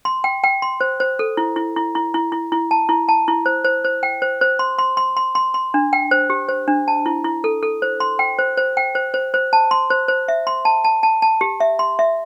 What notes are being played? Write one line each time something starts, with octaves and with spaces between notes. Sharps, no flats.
C6
G5
G5
C6
C5
C5
A4
E4
E4
E4
E4
E4
E4
E4
A5
E4
A5
E4
C5
C5
C5
G5
C5
C5
C6
C6
C6
C6
C6
C6
D4
G5
C5
G4
C5
D4
A5
E4
E4
A4
A4
C5
C6
G5
C5
C5
G5
C5
C5
C5
A5
C6
C5
C5
E5
C6
A5
A5
A5
A5
G4
E5
C6
E5